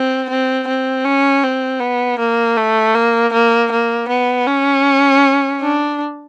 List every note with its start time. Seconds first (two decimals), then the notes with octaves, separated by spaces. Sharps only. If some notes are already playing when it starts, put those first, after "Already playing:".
Already playing: C4
0.30 C4
0.68 C4
1.05 C#4
1.44 C4
1.81 B3
2.19 A#3
2.57 A3
2.95 A#3
3.33 A#3
3.72 A#3
4.09 B3
4.47 C#4
5.61 D4